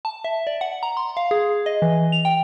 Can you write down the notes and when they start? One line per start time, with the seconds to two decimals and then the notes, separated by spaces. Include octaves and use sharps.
0.05 A5
0.24 E5
0.47 D5
0.61 F#5
0.83 A#5
0.97 C6
1.17 F5
1.31 G#4
1.66 D#5
1.82 E3
2.12 F7
2.25 G5